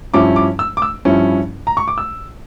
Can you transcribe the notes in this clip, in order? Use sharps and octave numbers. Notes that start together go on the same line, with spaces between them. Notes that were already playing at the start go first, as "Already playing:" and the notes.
G2 F3 C#4 E4 D6
D6
E6
D6
E6
G2 F3 C#4 E4
A#5
C#6
D6
E6